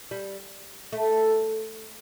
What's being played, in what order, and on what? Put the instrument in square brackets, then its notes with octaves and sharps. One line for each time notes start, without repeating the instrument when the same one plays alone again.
[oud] G3
A3